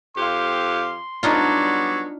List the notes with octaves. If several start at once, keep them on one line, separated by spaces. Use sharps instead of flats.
F2 G4 F5 C6
F#3 G3 B3 D4 D#4 F4